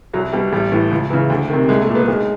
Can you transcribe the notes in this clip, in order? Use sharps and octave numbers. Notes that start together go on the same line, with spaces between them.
C2 F#3
B2 G3
A1 G3
A2 E3
C#2
C#3 E3
D2
C3 D#3
C2 G#3
A3
A#2
B3
B1 G#3